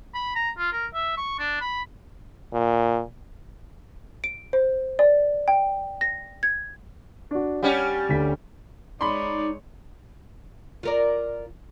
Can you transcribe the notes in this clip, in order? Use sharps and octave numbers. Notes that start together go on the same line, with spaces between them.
B5
A#5
F4
A#4
E5
C#6
D4
B5
A#2
D7
C5
D5
G5
A#6
G#6
D4 F#4
G3 C#4 G4 F#5
D2 D3 B6
G#3 D#4 C#5 D5 B5 C6
F4 A#4 D5